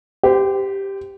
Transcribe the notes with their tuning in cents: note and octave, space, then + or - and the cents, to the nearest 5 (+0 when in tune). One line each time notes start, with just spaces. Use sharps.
G4 +0 C5 -35